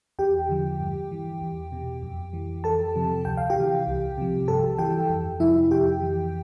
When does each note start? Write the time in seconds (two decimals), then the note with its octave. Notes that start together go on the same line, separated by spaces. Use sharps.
0.19 E2 G4 G5
0.49 D3 F3
0.80 G2
1.11 E3
1.41 E2
1.72 B2
2.03 F2
2.33 E3
2.64 F2 A4 A5
2.95 C3 F3
3.25 D2 G5
3.37 F5
3.50 G4 G5
3.56 C3 E3
3.87 C2
4.18 C3 F3
4.48 G2 A4 A5
4.78 E3 G4 G5
5.10 F2
5.40 C3 F3 E4 E5
5.71 F2 G4 G5
6.02 E3